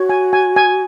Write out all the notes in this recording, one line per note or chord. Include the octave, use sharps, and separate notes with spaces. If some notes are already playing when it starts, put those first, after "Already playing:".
Already playing: F#4 C#5
G#5
G#5
G#5